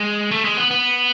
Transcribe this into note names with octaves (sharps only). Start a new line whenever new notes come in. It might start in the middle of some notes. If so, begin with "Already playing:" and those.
Already playing: G#3
A3
G#3
B3
B3